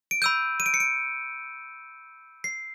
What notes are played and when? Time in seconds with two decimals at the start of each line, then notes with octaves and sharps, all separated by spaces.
0.11 D7
0.22 B5 E6 G6 D#7
0.60 D#7
0.66 D7
0.74 C#7
0.80 D7
2.44 C7